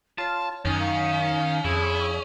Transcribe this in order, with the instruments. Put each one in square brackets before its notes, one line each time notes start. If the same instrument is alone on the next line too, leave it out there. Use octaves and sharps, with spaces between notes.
[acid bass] F4 [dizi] C#5 [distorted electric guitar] A5
[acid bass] F#2 [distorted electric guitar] D#3 [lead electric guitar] C#4 [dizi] G#5
[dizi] F5
[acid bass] F2 [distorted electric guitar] E4 [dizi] G#4